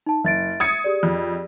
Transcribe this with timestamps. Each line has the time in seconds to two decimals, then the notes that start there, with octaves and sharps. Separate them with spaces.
0.06 D#4 A5
0.24 F#1 E5 A6 D7
0.60 D#6 G#6 C#7
0.84 G4 G#4 D5
1.03 F2